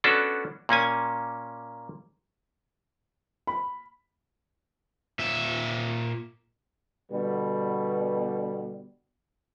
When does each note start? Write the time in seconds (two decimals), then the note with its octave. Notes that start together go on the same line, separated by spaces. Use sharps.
0.04 B3 C#4 D4 F#4 A4
0.69 A#2 A#3 C#4 G#5
3.47 B5
5.19 A#2 E5
7.11 B2 D3 G3 B3